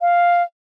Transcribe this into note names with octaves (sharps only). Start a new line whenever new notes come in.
F5